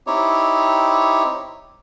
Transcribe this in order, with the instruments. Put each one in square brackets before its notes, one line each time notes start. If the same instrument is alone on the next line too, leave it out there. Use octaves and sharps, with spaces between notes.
[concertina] C4 D#4 E4 G4 C#5